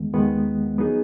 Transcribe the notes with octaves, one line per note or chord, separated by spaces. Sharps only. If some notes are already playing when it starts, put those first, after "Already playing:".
Already playing: D#2 D#3 G#3 B3
D#2 D#3 G#3 B3
F#3 B3 D#4 G#4